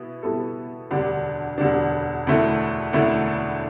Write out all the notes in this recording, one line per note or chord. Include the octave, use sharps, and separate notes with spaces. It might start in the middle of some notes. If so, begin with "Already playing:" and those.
Already playing: B2 B3 E4
B2 G3 B3 E4 A4
E1 D2 D3 G3 D4
E1 D2 D3 G3 D4
E1 D2 D3 A3 E4
E1 D2 D3 A3 E4